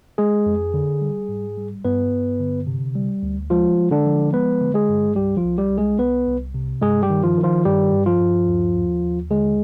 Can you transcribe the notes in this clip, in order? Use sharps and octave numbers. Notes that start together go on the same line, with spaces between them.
G#3 G#4
F2
D3
G3
G#2
G3
G2 B3 B4
G2
D3
C3
G3
D2
F3 G#3 F4
G#3
D3 D4
F3
G#3 B3 B4
D3
G#3 G#4
G2
C2 G3 G4
F3 F4
C2
G3 G4
C2
G#3 G#4
C2 B3 B4
C2
C3
G2 G#3 G#4
G3 G4
D#3
F3 F4
D#3
F3 F4
G2 G3 G4
G2
F3 F4
G2
D#2
D#2
D#2
D3 G#3 G#4